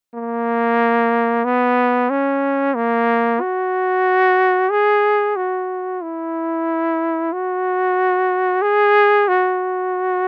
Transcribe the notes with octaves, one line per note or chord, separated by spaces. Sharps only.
A#3
B3
C#4
A#3
F#4
G#4
F#4
E4
F#4
G#4
F#4